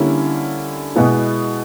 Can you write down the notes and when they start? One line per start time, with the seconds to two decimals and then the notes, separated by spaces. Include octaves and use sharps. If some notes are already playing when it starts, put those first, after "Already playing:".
Already playing: D3 G3 A#3 C#4 E4
0.96 B2 G#3 B3 E4